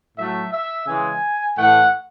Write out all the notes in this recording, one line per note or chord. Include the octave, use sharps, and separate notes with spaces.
A2 F#3 A3 E5
E5
C#3 E3 G#3 G#5
A2 E3 A3 F#5